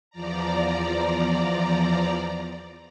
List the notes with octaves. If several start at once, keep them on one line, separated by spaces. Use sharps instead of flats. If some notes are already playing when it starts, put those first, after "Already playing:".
E2 F3 D5 A#5